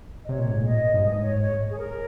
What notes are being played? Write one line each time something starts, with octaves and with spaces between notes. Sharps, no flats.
D#5
C3 C#5
A#2
G#2
A#2 D#5
G2
G#2 D#5
C#5
C#5
G#4
A#4